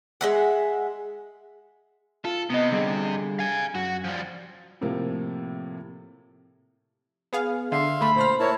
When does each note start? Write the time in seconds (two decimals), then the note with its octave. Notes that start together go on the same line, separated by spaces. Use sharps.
0.21 G#3 E5 F#5
2.25 F4 A4
2.50 C3 B3 D#5
2.71 D3 G3 G#4
3.39 F5 G#5
3.75 F#2 F#4
4.04 F3 G3
4.81 A2 C3 F3 A#3
7.33 B3 G#4 F5
7.72 D3 E5 F5 C6
8.01 D3 A3 B5
8.16 A#2 A3 C5 F6
8.40 E4 A#4 C#5 A5